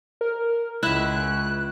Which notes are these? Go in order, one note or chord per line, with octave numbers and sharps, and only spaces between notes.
A#4
C#2 E4 E5 F#6